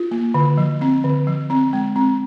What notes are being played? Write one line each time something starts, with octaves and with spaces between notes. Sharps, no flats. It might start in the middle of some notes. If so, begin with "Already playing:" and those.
Already playing: F4
A#3
D3
F3
C4
D3
F3
C4
G#3
C4